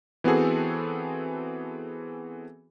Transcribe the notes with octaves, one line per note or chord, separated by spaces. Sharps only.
E3 B3 C4 F#4 G#4 A4